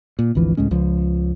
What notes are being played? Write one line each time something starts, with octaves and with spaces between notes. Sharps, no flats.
A#2
G#1 D2 E3 F3
C#2 A2 G#3 C#4
C#2 F3